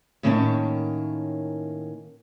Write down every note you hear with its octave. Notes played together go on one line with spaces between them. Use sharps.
A2 D#3 A#3 C#4 C#5 A5